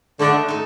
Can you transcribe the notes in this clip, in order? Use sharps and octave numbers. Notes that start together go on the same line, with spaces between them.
D3 A3 D4 A4 D#5
D#4 A4